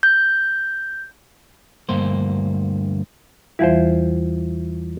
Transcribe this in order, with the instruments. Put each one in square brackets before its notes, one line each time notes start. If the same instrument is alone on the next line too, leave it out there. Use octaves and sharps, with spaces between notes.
[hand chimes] G6
[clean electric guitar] D2 G2 A#3 C5
[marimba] E2 E3 G3 [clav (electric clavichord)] E4 F4 C5